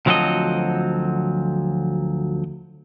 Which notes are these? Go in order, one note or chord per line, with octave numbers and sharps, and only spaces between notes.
D2 F3 F#3 C4 A4 D#5